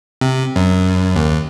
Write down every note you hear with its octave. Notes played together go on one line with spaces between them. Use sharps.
C3
F#2
D#2